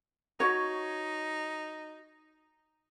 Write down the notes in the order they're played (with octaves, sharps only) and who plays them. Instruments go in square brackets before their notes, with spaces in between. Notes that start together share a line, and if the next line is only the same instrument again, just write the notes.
[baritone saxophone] D#4 [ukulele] F#4 C#5